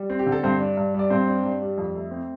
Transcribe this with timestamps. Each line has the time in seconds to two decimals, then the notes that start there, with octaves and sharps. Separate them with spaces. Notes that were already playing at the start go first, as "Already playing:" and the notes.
Already playing: G3
0.10 C4
0.19 G4
0.26 D3
0.32 A4
0.43 G2 C4 C5
0.60 D4
0.77 G2
0.94 G3 D5
1.10 G2 C4 C5
1.27 D4
1.44 G2
1.62 G3
1.78 F2
1.95 A3
2.11 C4